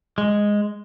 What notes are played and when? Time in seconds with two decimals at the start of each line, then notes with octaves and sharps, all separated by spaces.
0.18 G#3